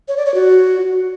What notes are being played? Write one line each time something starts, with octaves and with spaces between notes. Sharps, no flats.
C#5
D5
C#5
F#4